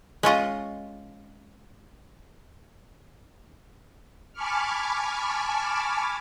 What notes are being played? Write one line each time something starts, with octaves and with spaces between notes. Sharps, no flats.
G#3 C#4 F4 D#5
G#5 A5 B5 C#6 D6 F6